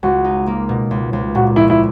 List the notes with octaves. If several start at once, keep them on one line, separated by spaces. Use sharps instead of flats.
C#2 F#4
D#4
A#3
B2
C#2
C#2
A#2 F#4
A#1 E4
E4